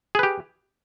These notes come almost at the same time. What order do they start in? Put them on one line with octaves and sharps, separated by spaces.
G#4 B4 G4